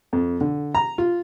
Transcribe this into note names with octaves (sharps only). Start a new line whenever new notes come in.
F2
D3
A#5
F4